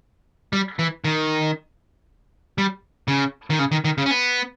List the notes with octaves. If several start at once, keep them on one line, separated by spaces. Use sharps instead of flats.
G3
E3
D#3
G3
C#3
D#3
C#3
D#3
D#3
C#3
C#4
B3